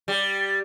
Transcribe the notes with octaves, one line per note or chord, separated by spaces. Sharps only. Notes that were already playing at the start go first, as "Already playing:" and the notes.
G3